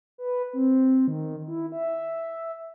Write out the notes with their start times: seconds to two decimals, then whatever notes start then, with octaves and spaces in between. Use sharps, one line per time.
0.18 B4
0.53 C4
1.08 D#3
1.47 E4
1.72 E5